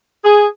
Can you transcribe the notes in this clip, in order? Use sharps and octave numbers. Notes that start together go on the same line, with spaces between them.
G#4